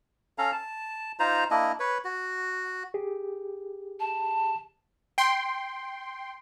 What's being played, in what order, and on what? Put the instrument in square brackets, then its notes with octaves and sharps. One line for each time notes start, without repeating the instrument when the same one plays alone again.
[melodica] C#4 A4 F5 A#5
A5
D#4 F4 C5 A#5
A#3 D4 E4 D#5
B4 C#5
F#4
[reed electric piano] G4 G#4
[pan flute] A5
[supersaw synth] G5 C6